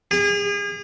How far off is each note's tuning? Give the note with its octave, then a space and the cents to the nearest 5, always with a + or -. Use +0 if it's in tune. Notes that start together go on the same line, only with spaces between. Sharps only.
G#4 -35